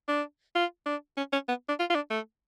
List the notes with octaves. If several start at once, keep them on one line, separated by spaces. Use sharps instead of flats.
D4
F4
D4
C#4
C#4
B3
D4
F4
F4
D4
A3